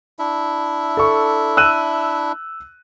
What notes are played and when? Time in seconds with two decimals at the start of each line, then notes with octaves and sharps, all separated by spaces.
0.19 D4 E4 E5
0.97 A4 C#6
1.57 E6 F#6 D#7